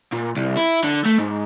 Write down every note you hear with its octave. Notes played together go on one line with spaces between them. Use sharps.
A#2
C2
E4
D3
A3
G#2